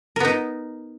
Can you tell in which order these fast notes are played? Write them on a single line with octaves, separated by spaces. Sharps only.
A#4 B3 D#4